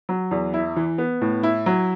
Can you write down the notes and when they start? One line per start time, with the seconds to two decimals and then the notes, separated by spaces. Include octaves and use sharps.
0.09 F#3
0.31 E2
0.54 E4
0.76 E3
0.98 B3
1.21 A2
1.43 E4
1.66 F#3